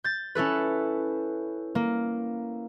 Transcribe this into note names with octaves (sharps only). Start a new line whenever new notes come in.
G6 A6
C#4 E4 A4 B4
A#3